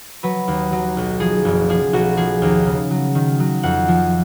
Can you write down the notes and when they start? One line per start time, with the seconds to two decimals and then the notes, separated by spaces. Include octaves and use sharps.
0.23 F#3 B4
0.48 D#2
0.72 F#3
0.97 B1
1.20 F3 G#4
1.45 F#1
1.69 F3 G#4
1.93 B1 F#4
2.17 F3 G#4
2.42 D#2
2.66 C#3
2.91 F#3
3.15 D#3
3.40 F#3
3.63 F2 F#5
3.88 F3